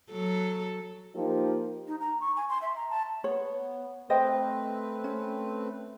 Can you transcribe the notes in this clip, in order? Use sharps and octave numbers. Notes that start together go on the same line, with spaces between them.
F#3 A4
F3 A#3 D#4 G4
D#4
A#5
C#6
G#5
C6
E5
A#5
A5
B3 C#5
A3 C4 B4 C5 D#5 G5
C#4